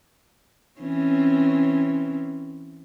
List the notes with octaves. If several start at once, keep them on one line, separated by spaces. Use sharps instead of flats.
E3 C4 C#4